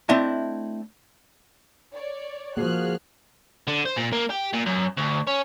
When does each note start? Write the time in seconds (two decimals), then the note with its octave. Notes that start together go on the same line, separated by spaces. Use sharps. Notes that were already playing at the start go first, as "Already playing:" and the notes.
0.09 A3 C4 D4 E4 D#5 A5
1.94 C#5 D5
2.57 F3 A#3 F#4 G#4 F6 F#6
3.68 D3
3.86 C5
3.97 A#2
4.13 A#3
4.30 G4
4.53 A#2
4.66 F#2
4.98 D2
5.27 C#4